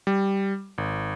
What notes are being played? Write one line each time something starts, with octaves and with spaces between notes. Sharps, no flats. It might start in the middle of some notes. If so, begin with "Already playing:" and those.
G3
G#1